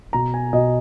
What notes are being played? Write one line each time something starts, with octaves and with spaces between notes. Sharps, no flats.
B2 A#5
G#5
B2 D#5